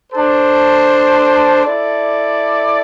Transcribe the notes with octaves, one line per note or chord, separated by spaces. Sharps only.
D4 A4 C5
E4 A4 D5